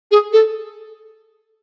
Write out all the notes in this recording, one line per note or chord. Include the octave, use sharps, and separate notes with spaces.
G#4
A4